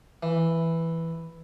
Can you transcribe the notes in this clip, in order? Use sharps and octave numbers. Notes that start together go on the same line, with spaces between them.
E3